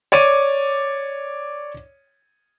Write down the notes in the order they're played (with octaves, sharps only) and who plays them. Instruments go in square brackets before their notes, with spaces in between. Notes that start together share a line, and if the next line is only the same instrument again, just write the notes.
[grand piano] C#5 D5 D6 D#7